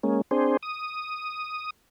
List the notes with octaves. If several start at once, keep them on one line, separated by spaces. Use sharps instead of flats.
G#3 A#3 C#4
C4 D4 G#4 C5
D#6